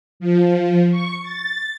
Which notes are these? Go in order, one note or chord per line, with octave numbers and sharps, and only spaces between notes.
F3
C#6
A6